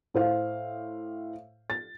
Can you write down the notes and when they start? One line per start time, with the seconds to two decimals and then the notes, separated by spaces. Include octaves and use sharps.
0.14 A2 C5 F5
1.70 A6